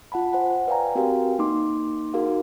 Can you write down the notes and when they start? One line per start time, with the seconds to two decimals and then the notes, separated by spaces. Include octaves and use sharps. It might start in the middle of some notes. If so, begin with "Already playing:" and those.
0.12 F4 F#5 A5 B5
0.32 C5 F#5 G#5
0.67 B4 D5 F5 G5 G#5 A#5
0.95 C4 F#4 G4 A#4 F5 G5
1.39 A#3 D#4 C6 D6
2.14 D#4 F#4 G#4 A#4 F5